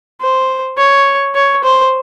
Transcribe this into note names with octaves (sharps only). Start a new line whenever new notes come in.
C5
C#5
C#5
C5